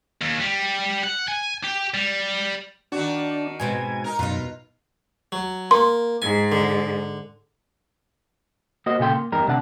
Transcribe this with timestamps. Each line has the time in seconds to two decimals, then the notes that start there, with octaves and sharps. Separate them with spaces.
0.21 D#2
0.40 G3
1.04 F#5
1.28 G#5
1.64 G4
1.94 G3
2.92 D#3 D4 F#4
3.60 G#2 B2 C4 G#5
4.04 D#4 A#4
4.19 F#2 B2 D#4 F4
5.32 F#3
5.71 A#3 C6
6.22 G#2 G#5
6.52 D3
8.86 A#3 F#4 C5 D#5
8.99 A#2 C#3 A4 G5 C6
9.13 A#3
9.32 E2 G2 D#4 G4 A#4
9.47 D2 C3 D4 F#5 A5